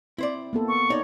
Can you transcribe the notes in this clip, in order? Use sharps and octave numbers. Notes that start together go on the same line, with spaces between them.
C4 E4 C5 D5
A#3 B3 A4
C#6
D#4 C#5 D5